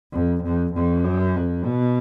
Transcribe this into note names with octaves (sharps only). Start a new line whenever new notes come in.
F2
F2
F2
F#2
F2
B2